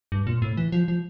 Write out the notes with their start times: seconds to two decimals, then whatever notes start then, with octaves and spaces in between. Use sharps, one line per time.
0.12 G2
0.27 A#2
0.42 A2
0.57 E3
0.72 F3
0.88 F3